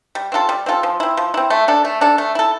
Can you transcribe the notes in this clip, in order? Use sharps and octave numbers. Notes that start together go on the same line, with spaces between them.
G3
C4 F4 A4
G3
C4 F4 A4
F3
C4 E4
F3
C4 E4
A3
D4 A4
A3
D4 A4
A3
E4 A4